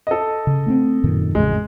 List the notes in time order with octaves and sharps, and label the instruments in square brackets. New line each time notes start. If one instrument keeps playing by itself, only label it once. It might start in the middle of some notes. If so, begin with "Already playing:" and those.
[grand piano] A4 D#5
[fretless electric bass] C#3
A3 B3 C4
F#2 A#2 D#3
[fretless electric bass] A1 F2 C#3 [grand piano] G#3